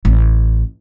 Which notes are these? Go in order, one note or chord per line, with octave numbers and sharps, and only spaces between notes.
A1